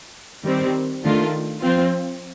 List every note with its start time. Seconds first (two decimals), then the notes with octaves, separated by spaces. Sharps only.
0.45 D#3 G3 C4
1.03 D#3 A3 D4 F4
1.61 F3 C4 F4